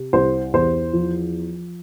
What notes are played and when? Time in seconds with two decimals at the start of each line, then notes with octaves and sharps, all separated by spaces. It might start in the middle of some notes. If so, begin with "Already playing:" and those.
Already playing: C3
0.13 C2 C5
0.53 E2 C5
0.93 F3